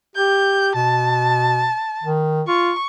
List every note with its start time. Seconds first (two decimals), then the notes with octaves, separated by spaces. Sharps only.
0.15 G4 G6
0.75 B2 A5
2.03 D#3
2.47 F4 C#6